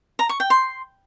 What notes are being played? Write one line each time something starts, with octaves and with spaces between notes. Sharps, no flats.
A#5
C#6
G5
C6